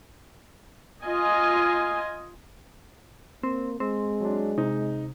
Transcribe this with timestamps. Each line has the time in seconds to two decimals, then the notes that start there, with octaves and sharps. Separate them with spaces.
1.03 F4 D#5 G#5
3.43 A#3 C4
3.80 G#3 C4
4.20 F#3 D4
4.58 C3 D#4